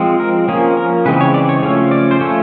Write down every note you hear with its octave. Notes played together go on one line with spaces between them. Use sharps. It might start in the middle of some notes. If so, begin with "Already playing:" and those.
Already playing: F3 G#3 C4
A#4
F3 A#3 C#4 G#4
A#4
C#3 E3 G#3 C4 B4
C#5
D5
C#5
C#3 F3 A3 C#4 C#5
D5
C5
F3 A3 C#4 C#5